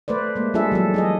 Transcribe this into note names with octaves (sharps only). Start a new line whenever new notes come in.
A3 B4 C5 D5
G#3 A#3
G3 D4 F4 G#4 A4 E5
E3 F#3 A4
D#4 G#4 D#5